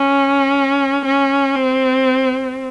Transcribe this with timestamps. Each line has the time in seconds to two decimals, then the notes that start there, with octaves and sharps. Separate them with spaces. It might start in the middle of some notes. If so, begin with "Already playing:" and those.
Already playing: C#4
1.05 C#4
1.55 C4